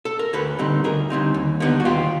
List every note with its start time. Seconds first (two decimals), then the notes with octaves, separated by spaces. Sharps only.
0.05 A4
0.19 A#4
0.33 D2 A4 B4
0.59 D3 G3 C4 D#4
0.84 D2 G#4 A#4
1.10 D3 G3 C4 D#4
1.34 D#2
1.60 D3 G3 B3 D#4
1.80 F#4
1.85 D#2 F4 G4